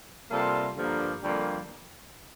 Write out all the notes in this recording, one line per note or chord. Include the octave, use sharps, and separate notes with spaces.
C3 G3 A#3 F4 A4
G2 D3 F3 A#3
F2 D3 G3 A#3